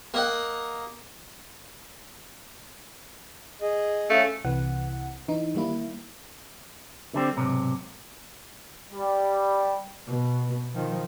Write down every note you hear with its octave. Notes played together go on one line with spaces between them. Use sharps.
A#3 D#5 F#5
G#4 D#5
A3 C#4 F5
C2 C3 E3 F#5
E3 D#4
D#3 G3 A#3 E4
D3 G3 C4
B1 G#2 C3
G3
B2
D#3 F3